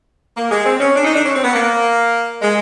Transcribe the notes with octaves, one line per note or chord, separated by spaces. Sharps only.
A#3
G#3
C4
C#4
D4
D#4
D4
C#4
C4
B3
A#3
G#3